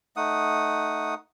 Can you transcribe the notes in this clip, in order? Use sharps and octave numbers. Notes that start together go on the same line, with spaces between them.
A3 D#4 F#5 D#6